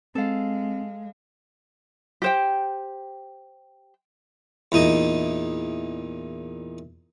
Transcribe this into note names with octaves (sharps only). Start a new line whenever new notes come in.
G#3 C4 A4 F5
G4 C5 G5
E2 A#2 D#4 D#5